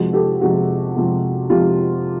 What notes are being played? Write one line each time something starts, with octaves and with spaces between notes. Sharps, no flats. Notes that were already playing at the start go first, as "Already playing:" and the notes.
Already playing: F2 C3 F3 G#3 F#4 G#4
G4 A4
F2 C3 F3 G#3 F#4 G#4
F2 C3 F3 G#3
F2 C3 F3 G#3 F4 G4